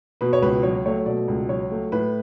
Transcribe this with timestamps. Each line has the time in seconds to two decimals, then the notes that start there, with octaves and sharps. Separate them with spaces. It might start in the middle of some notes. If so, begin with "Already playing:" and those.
0.21 B2 B4
0.33 C#5
0.42 C#2 B4
0.63 F#3 C#5
0.85 A3 C#5
1.06 B2 D5
1.28 C#2
1.49 F#3 C#5
1.71 A3
1.92 A2 B4